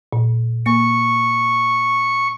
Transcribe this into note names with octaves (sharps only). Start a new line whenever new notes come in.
A#2
A#3 C#6